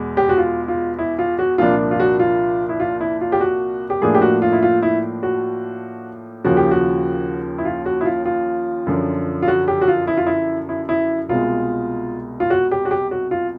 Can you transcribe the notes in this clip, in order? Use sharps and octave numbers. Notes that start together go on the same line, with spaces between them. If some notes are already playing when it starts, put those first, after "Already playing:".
Already playing: E2 B2 G#3
G4
F#4
F4
F4
E4
F4
F#4
C2 A#2 F3 A#3 D4 F4
F4
F#4
F4
E4
F4
E4
F4
G4
F#4
G4
A2 F3 A#3 D4 G#4
G4
F#4
F4
E4
F4
E4
F#4
D#2 C#3 F3 F#4
G4
F#4
E4
F4
F#4
E4
F4
F4
F#2 D3 F3
F4
F#4
G4
F#4
F4
E4
F4
E4
E4
E4
C2 B2 G#3 F4
F4
F#4
G4
F#4
G4
F#4
F4